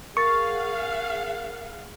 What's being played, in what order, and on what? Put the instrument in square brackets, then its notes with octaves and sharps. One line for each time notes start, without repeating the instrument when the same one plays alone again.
[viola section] G#4 F5 F#5 [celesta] A#4 A6 [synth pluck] C#6